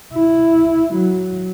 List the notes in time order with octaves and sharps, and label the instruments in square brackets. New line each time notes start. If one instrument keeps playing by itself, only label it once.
[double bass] E4
F#3